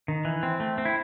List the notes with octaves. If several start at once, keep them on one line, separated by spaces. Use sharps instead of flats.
D#3
E3
C4
A3
C4
E4